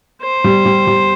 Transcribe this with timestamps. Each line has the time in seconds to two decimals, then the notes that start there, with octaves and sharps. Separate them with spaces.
0.22 C5
0.44 G3
0.66 G3
0.87 G3